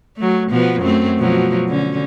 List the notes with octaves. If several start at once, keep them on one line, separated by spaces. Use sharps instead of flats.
F#3 A3
B2 F3 B3
F#2 A3 C4
B2 F3 F#3
D3 C#4